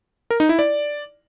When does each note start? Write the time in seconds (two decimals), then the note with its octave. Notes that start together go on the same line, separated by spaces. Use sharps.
0.30 A#4
0.40 D#4
0.49 E4
0.59 D5